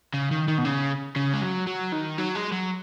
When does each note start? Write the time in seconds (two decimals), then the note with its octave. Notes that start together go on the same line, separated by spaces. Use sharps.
0.14 C#3
0.31 D#3
0.48 D#3
0.58 B2
0.65 C#3
1.16 C#3
1.33 G#3
1.42 F#3
1.67 F#3
1.92 D#3
2.18 F#3
2.35 G#3
2.52 F#3